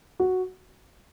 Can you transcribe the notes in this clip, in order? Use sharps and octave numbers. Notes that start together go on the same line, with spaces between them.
F#4